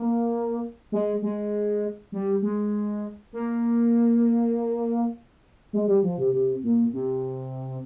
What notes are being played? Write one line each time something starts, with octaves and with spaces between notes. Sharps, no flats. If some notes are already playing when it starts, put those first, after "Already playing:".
Already playing: A#3
G#3
G#3
G3
G#3
A#3
G#3
G3
F3
C3
C3
A#2
C3